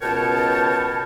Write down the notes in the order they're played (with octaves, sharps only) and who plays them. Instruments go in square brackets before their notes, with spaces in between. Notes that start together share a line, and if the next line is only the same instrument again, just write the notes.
[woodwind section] C#2 B2 A#4 C#5 G5 A5